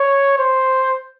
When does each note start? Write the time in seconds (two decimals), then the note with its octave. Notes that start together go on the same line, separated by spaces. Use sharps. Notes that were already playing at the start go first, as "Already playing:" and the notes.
Already playing: C#5
0.38 C5